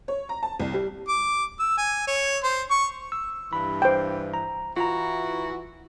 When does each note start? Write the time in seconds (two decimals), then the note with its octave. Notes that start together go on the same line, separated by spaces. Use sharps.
0.08 C#5
0.29 A#5
0.43 A5
0.60 C2
0.73 G3
1.08 D6
1.60 E6
1.78 G#5
2.08 C#5
2.44 C5
2.71 C#6
3.12 E6
3.53 G2 E3 B5
3.82 C5 G5
4.34 A#5
4.77 E3 F4 F#4 A#5